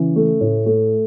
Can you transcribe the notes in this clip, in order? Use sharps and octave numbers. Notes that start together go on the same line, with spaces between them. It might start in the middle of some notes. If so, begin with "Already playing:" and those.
Already playing: C#3 E3
A3
A2
A3